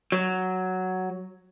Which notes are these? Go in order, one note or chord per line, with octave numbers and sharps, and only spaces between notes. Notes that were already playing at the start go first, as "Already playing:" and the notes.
F#3